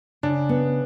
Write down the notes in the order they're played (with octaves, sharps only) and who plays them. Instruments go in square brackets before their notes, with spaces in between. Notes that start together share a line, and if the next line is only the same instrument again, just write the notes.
[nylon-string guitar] C#3 [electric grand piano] D4
[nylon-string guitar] B3